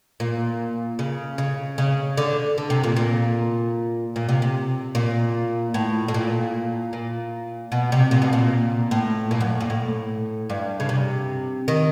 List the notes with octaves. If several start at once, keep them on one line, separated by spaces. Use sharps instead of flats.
A#2
C#3
C#3
C#3
D3
D3
C3
A#2
A#2
A#2
C3
C3
A#2
A2
A2
A#2
A#2
B2
C3
A#2
B2
A#2
A2
A#2
F#2
A#2
A2
G2
C#3
C3
D#3